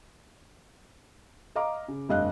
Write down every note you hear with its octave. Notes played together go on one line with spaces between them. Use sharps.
D#5 F5 A#5 D6
C#3
F1 G2 D#5 F5 F#6